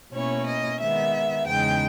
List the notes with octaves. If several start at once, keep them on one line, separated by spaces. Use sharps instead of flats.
B2 A#3 C#4 E4 C#5
D#5
D#3 G#3 B3 E5
E2 C#3 G#3 D#4 G5